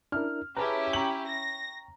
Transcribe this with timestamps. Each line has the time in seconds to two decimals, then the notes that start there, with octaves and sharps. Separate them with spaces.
0.12 D4 E4 A#4 F6
0.57 C#4 E4 G4 G#4 B4 A5 A#5
0.93 G5 A#5 C#6 F#7
1.27 A#6